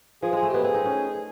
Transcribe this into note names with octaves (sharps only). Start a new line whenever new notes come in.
F3 G#4
G#3 G#4
A3
B3 G4
C4 G#4
D#4
C#4